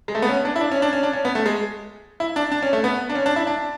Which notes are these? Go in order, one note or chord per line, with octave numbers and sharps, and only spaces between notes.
G#3
A3
B3
C#4
D4
E4
D4
C#4
D4
C#4
D4
C#4
B3
A3
G#3
E4
D4
D4
C#4
A3
B3
D4
C#4
D4
E4
D4